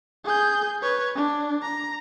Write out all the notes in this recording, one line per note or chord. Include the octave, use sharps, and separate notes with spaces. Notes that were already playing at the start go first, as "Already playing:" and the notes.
G#4 G6
B4 C#5
D4
A#5